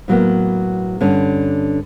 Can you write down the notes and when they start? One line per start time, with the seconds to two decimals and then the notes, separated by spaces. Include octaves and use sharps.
0.08 A2 F#3 A#3 B3
1.00 G2 D3 C#4